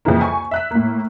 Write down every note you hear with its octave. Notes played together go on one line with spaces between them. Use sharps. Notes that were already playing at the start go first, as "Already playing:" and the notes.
C2 F2 C#3 E3 A#3
G#5 C#6
E5 F#6 B6
A2 A#3